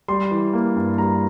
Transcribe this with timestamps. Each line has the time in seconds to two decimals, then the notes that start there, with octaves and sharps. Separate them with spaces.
0.08 G3 C6
0.31 E3
0.53 A#3
0.76 G2
0.98 G3 A#5